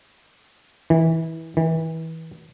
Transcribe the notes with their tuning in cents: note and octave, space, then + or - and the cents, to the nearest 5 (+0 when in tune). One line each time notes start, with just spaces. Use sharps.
E3 -20
E3 -30